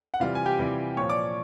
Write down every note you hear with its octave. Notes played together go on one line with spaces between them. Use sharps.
F#5
C3 E3 G3 F4 F5
G#5
G4 G5
C3 E3 G3
A#2 F3 C#5 C#6
D5 D6